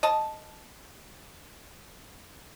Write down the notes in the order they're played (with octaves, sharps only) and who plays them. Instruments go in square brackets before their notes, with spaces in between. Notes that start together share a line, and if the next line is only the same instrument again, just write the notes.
[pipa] D#5 A5